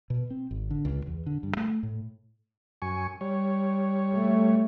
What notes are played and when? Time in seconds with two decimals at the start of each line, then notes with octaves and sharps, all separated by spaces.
0.10 B2
0.30 C4
0.51 G#1
0.71 D3
0.85 C#2
1.07 E2
1.26 D3
1.43 G2
1.57 A3
1.83 A2
2.82 F#2 G#5 C#6
3.21 G3 C#5
4.13 A3